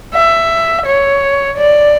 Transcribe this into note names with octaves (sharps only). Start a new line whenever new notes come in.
E5
C#5
D5